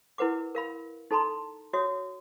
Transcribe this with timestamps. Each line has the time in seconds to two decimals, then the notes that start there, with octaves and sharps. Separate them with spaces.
0.18 E4 A#4 B4 F#5 D6
0.55 A#4 F5 B5
1.11 D#4 A4 A5 A#5 C6
1.73 F#4 C#5 E5 D#6